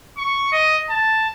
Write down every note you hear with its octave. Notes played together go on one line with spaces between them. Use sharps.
C#6
D#5
A5